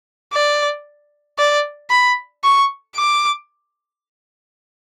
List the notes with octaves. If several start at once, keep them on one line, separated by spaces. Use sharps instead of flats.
D5
D5
B5
C#6
D6